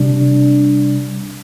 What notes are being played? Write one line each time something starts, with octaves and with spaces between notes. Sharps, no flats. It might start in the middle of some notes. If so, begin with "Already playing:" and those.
Already playing: C3 G3 D4